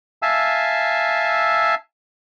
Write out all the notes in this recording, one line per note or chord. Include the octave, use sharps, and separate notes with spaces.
E5 F5 G#5 A5 E6